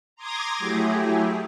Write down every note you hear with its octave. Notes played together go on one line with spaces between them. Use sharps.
A#5 C6 D6 D#6 G#6 A#6
F#3 A3 E4 G4 G#4